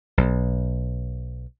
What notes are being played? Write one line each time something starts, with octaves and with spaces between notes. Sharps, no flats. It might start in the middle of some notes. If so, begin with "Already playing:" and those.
B1